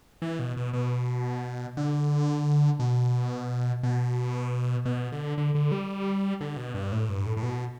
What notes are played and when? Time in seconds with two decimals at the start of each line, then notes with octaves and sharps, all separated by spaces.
0.22 E3
0.39 B2
0.57 B2
0.73 B2
1.77 D3
2.79 B2
3.83 B2
4.85 B2
5.12 D3
5.38 D3
5.55 D3
5.72 G3
6.41 D3
6.57 B2
6.74 G2
6.92 A2
7.09 G2
7.26 A2
7.37 A2
7.43 B2